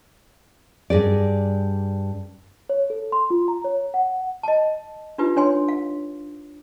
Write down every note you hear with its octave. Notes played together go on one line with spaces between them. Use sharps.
G2 G#4 D5
C#5
A4
C6
F4
A#5
C#5
F#5
D#5 A5
D4 D#4 F4 G4 B4
D4 C#5 G#5 C6
F5